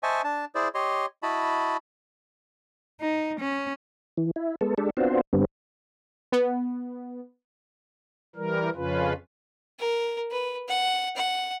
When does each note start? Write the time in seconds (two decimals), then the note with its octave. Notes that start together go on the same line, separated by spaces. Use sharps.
0.03 C5 D#5 E5 G#5 A5 C#6
0.24 D4 A5
0.55 E4 G#4 C5 D5
0.75 G4 C#5 D#5 C6
1.23 E4 F#4 D#5 A5 B5
3.01 D#4
3.40 C#4
4.17 E3
4.36 E4
4.61 G#3 B3 A4
4.78 G#3 D4 G4 A4
4.97 B3 C4 D4 F4 F#4 C5
5.33 G2 D3 G3 B3 C4
6.32 B3
8.36 E3 G3 A#4
8.75 F2 C#3 C#4 F4 B4
9.79 A#4
10.31 B4
10.68 F#5
11.16 F#5